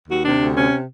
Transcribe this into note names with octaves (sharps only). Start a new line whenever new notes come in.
D#2 F#4
C3 D4
D2
C3 C#4